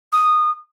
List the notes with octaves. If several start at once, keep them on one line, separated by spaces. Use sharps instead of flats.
D#6